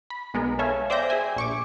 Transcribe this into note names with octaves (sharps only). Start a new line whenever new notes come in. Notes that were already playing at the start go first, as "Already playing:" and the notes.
B5
B1 G#3 B3 A#4
A4 B4 C#5 E5 F5 G#5
C5 D5 E5 G5 G6 A#6
G#4 E5 G#5
A#1 C#6 D6